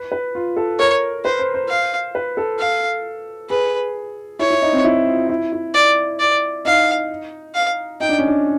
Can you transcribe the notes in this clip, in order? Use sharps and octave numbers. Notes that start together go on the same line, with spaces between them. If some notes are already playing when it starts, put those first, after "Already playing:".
Already playing: B4
B4
F4
A4
A#4 C#5
B4 C5
C5
C5
F5
B4
A4
F5
G#4 B4
E4 C#5
E4
D#4
C4
E4
F4
E4
E4
D5
D5
D#4 F5
F5
D#4 G5
D4
C#4
D4